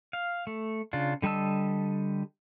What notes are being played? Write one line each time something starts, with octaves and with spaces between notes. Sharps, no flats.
F5
A3
C#3 D4 F4
D3 G3 D#5 A5 E6